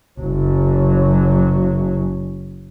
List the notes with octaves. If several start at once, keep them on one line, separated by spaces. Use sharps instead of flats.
F#1 F#3